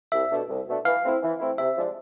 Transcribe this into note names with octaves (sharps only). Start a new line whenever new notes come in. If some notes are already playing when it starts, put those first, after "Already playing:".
C2 E5
B2 A3 D4 A4
C2
B2 A3 D4 A4
E3 F5
A3 C4 E4
E3
A3 C4 E4
C3 E5
F3 G#3 D4